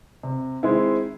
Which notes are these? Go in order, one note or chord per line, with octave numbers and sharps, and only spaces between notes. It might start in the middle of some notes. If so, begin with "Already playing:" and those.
C3
D#3 G#3 C4 E4